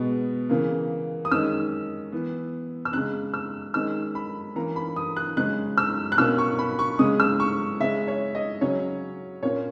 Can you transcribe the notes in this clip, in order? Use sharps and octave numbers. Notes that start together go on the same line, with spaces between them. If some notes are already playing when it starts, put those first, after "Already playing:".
Already playing: B2 G#3 B3
C#3 E3 A#3
D#6
D#3 G#3 C#4 E6
E3 B3
E6
C#3 G#3 C#4 F#6
E6
D#3 G#3 C#4 E6
B5
E3 A#3 C#4 A#5
B5
D#6
F#6
C#3 G#3 C#4 F#6
E6
F#6
B2 A#3 C#4 E6
C#6
B5
C#6
C#3 G#3 C#4 D#6
E6
C#6
C#3 G#3 C#4 E5
C#5
D#5
C#3 F#3 C#4 C#5
A#2 A#3 C#4 C#5